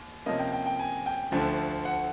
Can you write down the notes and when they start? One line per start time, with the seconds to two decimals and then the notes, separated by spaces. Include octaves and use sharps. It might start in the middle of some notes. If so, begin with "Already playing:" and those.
Already playing: D#2
0.26 C3 F3 A#3 C#4 D#5
0.39 G5
0.53 G5
0.66 G5
0.79 G#5
1.06 G5
1.32 D2 D3 F3 A3
1.85 F#5